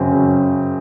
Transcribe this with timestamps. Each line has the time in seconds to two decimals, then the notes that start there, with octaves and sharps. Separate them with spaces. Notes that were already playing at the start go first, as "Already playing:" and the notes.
Already playing: F#2 C#3 C4
0.12 C#3